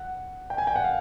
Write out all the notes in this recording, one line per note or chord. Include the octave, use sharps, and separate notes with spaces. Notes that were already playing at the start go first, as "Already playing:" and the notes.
Already playing: F#5
G5
G#5
G5
F#5
F5